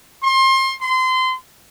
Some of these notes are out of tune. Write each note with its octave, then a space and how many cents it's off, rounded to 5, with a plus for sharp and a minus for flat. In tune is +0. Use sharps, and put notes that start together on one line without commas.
C6 +30
C6 -25